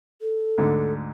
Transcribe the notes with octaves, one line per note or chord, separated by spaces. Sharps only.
A4
D2 G#2 D3